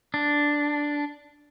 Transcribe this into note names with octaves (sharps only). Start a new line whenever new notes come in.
D4